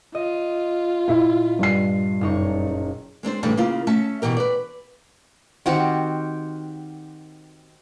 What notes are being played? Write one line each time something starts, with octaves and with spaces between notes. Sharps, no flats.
F4 D#5
A#2 E4
G2 C7
F#1 D#4 C#6
G#3 C4 D4 C5
A2 C#3 E3 G3 A3 D4
C#3 A#3 E4 F4
A3 C#4 E5 A5
B2 E3 G4 A#4
B4 D5
D#3 C4 F#4 G4